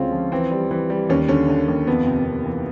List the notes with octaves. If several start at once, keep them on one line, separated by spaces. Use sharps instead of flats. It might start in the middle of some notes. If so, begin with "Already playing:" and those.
Already playing: D2 C#3 G#3 C4 C#4 F4
F3
E3 C4
G3
E3
G3
D#2 C#4
D3 C#4
D3
D#2
F2 B3
C3
F2
E3